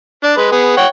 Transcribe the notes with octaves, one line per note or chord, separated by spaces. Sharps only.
D4
G#3 B4
B3 G#4
C#5 F#5 G5